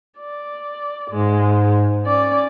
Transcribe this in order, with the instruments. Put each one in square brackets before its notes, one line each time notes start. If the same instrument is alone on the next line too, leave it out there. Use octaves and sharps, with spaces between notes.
[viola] D5
[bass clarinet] G#2 [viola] G#3
[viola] C#4 D5